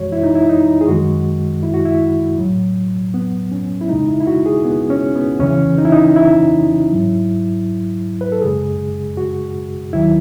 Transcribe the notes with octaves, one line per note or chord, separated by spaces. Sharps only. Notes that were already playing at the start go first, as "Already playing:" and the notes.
Already playing: F#2 E3 G#3 F#4 C#5
E4
D#4
E4
D#4
G#4
F#2 D#3 G#3 F#4
E4
F#4
E4
A2 F#3
B3
C#4
E4
E2 C#3 G#3 D#4
E4
E4
F#4
G#4
B3
C#4
B3
E2 C#3 E3 C#4
D#4
E4
D#4
E4
G#2 F#3
B4
A4
F#2 C#3 G#3 G#4
F#4
D#2 D#3 F#3 E4